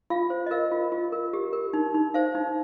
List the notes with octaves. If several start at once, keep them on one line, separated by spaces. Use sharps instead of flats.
F4 F5
C5
D#5
A#4 F5
F4
F4
A#4
G4
A#4
D#4
D#4
C5 F5
D#4